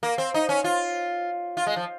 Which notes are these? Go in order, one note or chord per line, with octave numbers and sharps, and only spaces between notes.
A#3
C4
D#4
C#4
F4
F4
G#3
F3